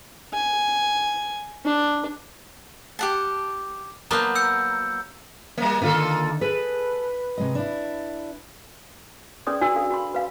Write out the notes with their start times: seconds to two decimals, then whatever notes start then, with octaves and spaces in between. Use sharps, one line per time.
0.34 G#5
1.65 D4
2.99 G4 F#5 A5
4.11 F#3 A#3 B3 F#5 A5 A#5 G6
4.35 E6 G6 C#7
5.58 G3 A#3
5.82 D3 D#3 A#3 F4 A4 F5
6.41 G#4 A4 B4
7.38 C3 G#3 D#5
7.55 D4 E4
9.47 C#4 G#4 B4 D5 C6 D#6
9.61 D4 F#4 B4 D5 G5 E6
9.76 A4 F5
9.90 F#4 B5 C6
10.14 B4 F5 G5